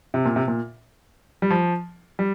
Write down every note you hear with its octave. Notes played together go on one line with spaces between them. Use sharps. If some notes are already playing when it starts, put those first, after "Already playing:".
C3
A#2
C3
A#2
G3
F3
G3